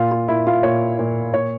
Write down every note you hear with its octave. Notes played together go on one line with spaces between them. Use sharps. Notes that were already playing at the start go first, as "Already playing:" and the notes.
Already playing: A#2 F4
F4
A#2 E4
F4
A#2 C#5
A#2
A#2 C#5